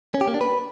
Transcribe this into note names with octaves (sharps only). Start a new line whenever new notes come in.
C#4
G4
A#3
D4
B4